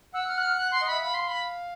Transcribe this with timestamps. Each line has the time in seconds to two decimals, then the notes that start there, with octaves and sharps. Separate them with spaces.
0.14 F#5 E6
0.28 F6
0.38 F#6
0.43 F6
0.57 F#6
0.72 C6
0.82 D#5
0.87 E5 B5
1.01 F5 B5
1.14 C6
1.27 B5